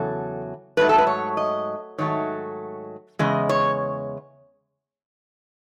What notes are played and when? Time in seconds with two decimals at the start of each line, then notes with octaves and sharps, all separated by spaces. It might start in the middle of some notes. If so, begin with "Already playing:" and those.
Already playing: E2 C#3 F#3 A4
0.77 G#2 F#3 A3 B4
0.89 A4
0.98 B4
1.07 C#5
1.37 D#5
1.98 G#2 D#3 F#3 A3 C#5
3.19 E2 C#3 G#3 D#5
3.49 C#5